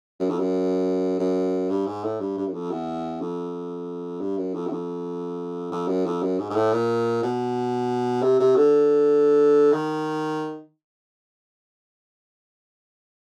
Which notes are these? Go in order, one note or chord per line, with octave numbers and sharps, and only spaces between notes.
F#2
F2
F#2
F#2
G2
G#2
A2
G2
G2
F#2
F2
E2
F2
G2
F#2
F2
E2
F2
F2
F#2
F2
F#2
G#2
G#2
A2
A#2
B2
C3
C3
D3
D#3